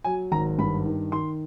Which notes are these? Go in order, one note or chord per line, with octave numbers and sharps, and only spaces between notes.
F#3 G#5
G#1 A#5
G2 B5
D#3
D#3 C6